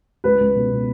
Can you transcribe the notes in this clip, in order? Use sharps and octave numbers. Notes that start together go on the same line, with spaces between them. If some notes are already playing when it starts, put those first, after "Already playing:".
C#2 B4
C#2
B2
B2